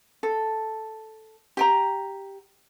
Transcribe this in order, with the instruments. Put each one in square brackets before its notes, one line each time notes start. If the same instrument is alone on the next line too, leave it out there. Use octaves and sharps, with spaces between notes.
[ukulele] A4
G4 G5 A#5